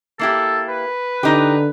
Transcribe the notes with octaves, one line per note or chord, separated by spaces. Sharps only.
A#3 E4 G4 A4
B4
D3 D#4 G4